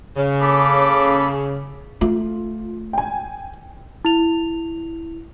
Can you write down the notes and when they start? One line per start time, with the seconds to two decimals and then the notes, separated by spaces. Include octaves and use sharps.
0.17 C#3
0.41 A#3 A4 B5 D6
2.01 A3 F4
2.93 G5 G#5
4.05 E4 F7